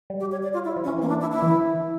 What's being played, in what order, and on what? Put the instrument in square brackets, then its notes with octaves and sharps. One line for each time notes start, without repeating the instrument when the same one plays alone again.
[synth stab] G3
[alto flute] G4
C#5
D5
F4
E4
[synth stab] F3
[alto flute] C#4
[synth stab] E3
[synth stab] E3 [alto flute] A#3
[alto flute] D4
E4
E4
[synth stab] E3